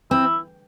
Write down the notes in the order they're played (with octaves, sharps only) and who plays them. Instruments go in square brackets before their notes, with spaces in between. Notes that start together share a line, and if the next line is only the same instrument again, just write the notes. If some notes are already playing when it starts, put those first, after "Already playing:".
[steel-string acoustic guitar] C4 [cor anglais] E4